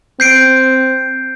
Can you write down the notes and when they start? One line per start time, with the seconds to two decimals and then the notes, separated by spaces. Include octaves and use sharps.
0.20 C4 G6 C7 D7